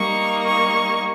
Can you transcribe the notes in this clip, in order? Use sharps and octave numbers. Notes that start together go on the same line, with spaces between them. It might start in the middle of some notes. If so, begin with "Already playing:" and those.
Already playing: G3 A#3 D#4 C#6
C#6